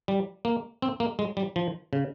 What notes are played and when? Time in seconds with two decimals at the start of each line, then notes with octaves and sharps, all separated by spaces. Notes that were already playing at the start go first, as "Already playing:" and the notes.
0.08 G3
0.45 A#3
0.82 C4
1.00 A#3
1.19 G#3
1.37 G3
1.56 F3
1.93 C#3